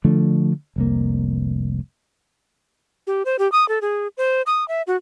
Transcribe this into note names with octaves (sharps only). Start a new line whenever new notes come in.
D3 F3 A3 D4
F1 C2 A#3
G4
C5
G4
D#6
A4
G#4
C5
D#6
E5
F#4